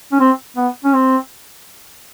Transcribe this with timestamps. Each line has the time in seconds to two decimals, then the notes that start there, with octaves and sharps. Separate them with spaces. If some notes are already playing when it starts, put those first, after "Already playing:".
0.12 C#4
0.20 C4
0.57 B3
0.84 C#4
0.94 C4